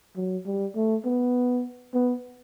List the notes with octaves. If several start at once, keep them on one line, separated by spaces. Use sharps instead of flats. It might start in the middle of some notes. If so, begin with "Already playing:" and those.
F#3
G3
A3
B3
B3